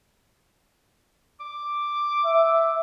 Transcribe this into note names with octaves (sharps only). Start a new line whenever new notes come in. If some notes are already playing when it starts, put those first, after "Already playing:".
D6
E5